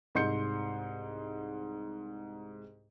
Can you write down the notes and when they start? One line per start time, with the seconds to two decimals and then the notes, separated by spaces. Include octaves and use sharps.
0.15 C2 G#2 D#5 C6 G6 C#7